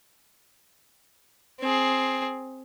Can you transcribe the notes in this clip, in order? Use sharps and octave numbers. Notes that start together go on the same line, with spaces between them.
C4 G#4